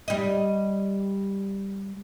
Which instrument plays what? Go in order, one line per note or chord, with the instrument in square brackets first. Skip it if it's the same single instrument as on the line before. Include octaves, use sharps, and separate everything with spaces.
[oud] G3 D#5